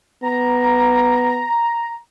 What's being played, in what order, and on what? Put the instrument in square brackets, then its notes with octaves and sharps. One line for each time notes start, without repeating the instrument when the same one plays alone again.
[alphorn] B3 [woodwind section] A#5